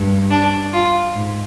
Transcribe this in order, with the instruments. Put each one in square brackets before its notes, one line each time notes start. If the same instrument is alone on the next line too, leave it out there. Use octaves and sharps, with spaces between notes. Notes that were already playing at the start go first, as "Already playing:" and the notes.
Already playing: [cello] G2
[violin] D4
F4
[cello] G#2